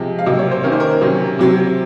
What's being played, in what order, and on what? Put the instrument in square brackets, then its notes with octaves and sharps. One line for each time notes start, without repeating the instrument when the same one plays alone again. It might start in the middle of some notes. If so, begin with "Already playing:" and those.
Already playing: [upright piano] C3 F3 G#3
F5
C3 F#3 A#3 D#5
C#5
C5
D#3 A#3 C#4 A#4
C5
A#4
C3 F#3 C#4
C3 F#3 C4